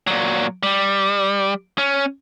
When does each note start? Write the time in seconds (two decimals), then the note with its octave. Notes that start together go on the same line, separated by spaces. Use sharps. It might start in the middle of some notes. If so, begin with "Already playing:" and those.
0.07 A#2 F#3
0.63 G3
1.78 C#4